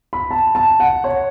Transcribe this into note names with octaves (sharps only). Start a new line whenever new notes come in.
B5
A5
A5
F#5
C#5